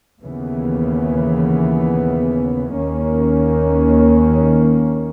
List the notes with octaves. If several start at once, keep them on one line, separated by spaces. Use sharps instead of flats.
D#2 C#3 E3 B3
D#2 D#3 A#3 C#4